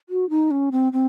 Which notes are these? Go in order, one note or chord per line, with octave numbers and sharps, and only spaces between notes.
F#4
D#4
C#4
C4
C4